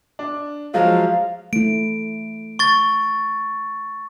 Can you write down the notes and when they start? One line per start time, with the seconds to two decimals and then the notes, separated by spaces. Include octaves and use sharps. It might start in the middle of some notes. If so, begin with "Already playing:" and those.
0.19 D4
0.74 F3 F#3 G#3 F5
1.53 A3 E4 D7
2.59 C#6 A6